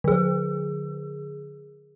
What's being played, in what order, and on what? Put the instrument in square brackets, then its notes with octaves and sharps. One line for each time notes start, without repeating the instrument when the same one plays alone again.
[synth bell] D3 G#4